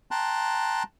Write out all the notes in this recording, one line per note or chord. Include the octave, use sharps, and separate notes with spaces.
G5 A5 A#5 C6 F#6